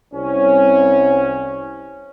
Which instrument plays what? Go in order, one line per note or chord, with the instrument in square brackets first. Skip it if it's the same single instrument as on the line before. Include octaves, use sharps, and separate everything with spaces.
[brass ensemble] C2 C#4